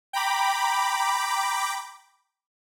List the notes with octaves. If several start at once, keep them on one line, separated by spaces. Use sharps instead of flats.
G5 A#5 B5 D6